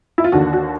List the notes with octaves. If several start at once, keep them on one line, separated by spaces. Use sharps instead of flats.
E4
F4
D#2 D3 F#4
F#4